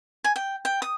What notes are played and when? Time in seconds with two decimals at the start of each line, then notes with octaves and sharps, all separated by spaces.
0.24 G#5
0.36 G5
0.65 G5
0.82 D#6